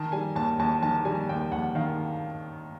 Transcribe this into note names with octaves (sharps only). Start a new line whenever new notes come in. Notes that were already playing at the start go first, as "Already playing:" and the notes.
Already playing: D#3 A5
G3 G#5
D#2 A5
D#2 A5
D#3 A5
G3 G#5
D#2 G5
D#2 F#5
D#3 F5